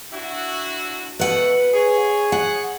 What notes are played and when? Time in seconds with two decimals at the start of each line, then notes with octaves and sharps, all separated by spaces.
0.12 D4 E4 F#4
1.20 B2 A3 B4 F#5
1.74 G#4 C#5
2.32 F#5